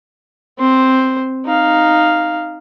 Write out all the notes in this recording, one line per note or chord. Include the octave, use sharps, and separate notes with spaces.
C4 C5
D#4 F5